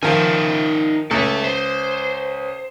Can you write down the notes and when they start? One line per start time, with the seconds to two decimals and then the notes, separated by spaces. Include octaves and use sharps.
0.03 D#3 F3 D#4 E5 G#5
1.11 C#2 A4 E5
1.44 C5